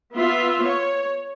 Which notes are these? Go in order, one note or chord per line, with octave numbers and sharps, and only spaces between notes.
B3 F4 E5
C#5